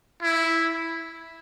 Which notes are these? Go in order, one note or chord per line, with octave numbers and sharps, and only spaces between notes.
E4